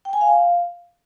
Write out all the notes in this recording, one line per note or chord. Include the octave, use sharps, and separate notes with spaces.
G5
G#5
F5